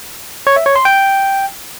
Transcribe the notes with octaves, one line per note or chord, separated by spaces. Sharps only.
C#5
E5
C#5
C6
G5